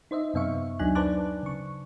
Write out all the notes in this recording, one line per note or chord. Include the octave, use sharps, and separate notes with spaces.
D#4 C5 D#5 E5
F#2 C3 B3 E5 F5 C#6
D2 F#3 D4 D#4 G#5 F#6
B4 C5 D5 A5 D6 F#6
C#3 C#6